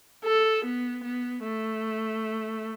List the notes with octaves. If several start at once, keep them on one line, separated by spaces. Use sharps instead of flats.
A4
B3
B3
A3